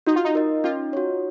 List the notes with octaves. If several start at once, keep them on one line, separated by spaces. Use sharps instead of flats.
D#4 F#4
F4
D#4
A#4 D#5
C#4 F4
F#4 C#5